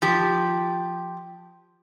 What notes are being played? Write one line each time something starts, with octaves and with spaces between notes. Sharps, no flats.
F3 G4